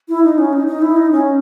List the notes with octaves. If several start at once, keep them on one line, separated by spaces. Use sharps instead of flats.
E4
D#4
C#4
D#4
D#4
E4
D#4
C#4